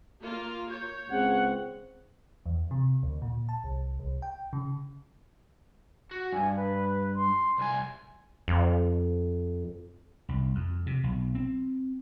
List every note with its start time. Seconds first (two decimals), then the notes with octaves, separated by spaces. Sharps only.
0.21 A#3 F4
0.70 C#5 G6
1.09 C#2 C#3 C4 F#5
2.46 E2
2.71 C3
3.03 D2
3.22 A#2
3.49 A5
3.64 C2
3.99 C2
4.22 G5
4.53 C#3
6.11 F#4
6.33 G2 G#5
6.56 B4
7.16 C6
7.58 C2 G#5
8.48 F2
10.29 C2
10.55 F2
10.86 C3
11.04 B1
11.35 C4